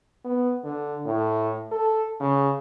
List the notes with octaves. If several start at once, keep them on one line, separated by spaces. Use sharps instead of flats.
B3
D3
A2
A4
C#3